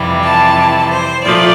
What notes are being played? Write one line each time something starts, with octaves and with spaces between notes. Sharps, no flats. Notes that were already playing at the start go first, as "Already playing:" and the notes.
Already playing: F2 C3 E3 G3
A5
C5
A#2 F3 A3 D5